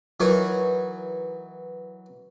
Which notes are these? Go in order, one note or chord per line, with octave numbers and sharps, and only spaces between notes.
E3 F#3 D#4 A#4 C#5